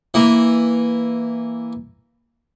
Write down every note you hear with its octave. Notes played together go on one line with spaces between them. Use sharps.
E3 A#3